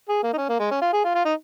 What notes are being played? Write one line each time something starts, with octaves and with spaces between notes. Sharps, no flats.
G#4
A#3
D#4
C#4
A#3
G#3
C#4
F4
G#4
F4
F4
D#4